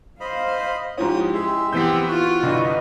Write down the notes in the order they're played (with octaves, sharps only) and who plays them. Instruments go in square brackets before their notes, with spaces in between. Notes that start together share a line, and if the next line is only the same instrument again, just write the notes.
[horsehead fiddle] C5 F5 [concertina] D#5 B5
[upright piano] G#2 F3 C#4 [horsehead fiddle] E4 G4 [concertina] D#6
[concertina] G#3 E5 [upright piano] G#4
[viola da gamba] E3 B3 G4 [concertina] C4 E6 [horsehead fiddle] E4 [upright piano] G6 B6
[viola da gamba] F4 [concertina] F#4 F#5
[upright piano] C2 G2 [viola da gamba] D3 [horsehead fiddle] B4 D#5